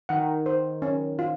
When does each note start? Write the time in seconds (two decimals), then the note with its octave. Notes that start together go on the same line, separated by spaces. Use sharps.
0.09 D#3 F#5
0.46 C5
0.82 C#4
1.19 F4